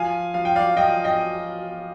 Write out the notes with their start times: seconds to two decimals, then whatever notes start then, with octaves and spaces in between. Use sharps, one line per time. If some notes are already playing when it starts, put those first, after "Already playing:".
Already playing: F3 F5 G#5
0.34 F3 F5
0.45 G5
0.55 D5 F5
0.76 F3 D#5 G5
1.04 D#5 G5